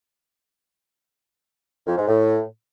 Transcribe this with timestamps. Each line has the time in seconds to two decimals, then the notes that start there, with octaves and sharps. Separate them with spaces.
1.87 F2
1.97 G#2
2.08 A2